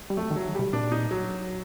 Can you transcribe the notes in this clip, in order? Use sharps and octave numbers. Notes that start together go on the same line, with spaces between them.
G3
F#3 A3
D#3
F#3
C3 G3
A#2 D4
D#4
F#3